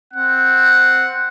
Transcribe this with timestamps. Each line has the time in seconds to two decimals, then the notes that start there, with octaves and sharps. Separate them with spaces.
0.14 C4 F#5